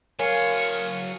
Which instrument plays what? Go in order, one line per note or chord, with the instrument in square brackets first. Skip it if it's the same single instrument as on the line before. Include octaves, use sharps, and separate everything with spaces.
[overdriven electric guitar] F#3 F5 [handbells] A#4 C#5 [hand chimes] G#5 [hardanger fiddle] C#6